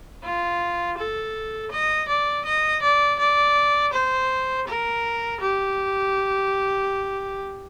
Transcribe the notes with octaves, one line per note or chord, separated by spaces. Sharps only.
F4
A4
D#5
D5
D#5
D5
D5
C5
A#4
G4